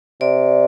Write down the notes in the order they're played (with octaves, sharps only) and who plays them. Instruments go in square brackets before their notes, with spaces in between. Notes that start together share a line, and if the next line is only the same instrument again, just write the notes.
[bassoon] C3 [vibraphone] D5